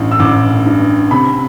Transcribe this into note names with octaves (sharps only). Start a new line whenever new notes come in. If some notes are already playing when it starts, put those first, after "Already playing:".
Already playing: A1 G2
E6
A1 D6
G2
C3 B5